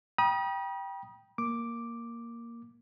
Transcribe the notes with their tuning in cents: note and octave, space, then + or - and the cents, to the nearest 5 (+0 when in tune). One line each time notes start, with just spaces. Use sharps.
G5 +0 B5 -45 D#6 +0
A#3 +0 D6 +0